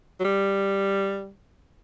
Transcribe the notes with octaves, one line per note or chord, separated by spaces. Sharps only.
F#3
G3